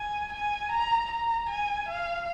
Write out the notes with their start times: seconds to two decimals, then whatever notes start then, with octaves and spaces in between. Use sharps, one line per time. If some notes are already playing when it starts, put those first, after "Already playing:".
Already playing: G#5
0.33 G#5
0.72 A#5
1.11 A#5
1.49 G#5
1.88 F5